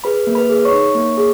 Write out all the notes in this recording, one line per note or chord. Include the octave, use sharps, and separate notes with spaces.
G#4 B4 B5
A#3
B4 B5
G#4
C#5 C#6
D#4
A#3
G#4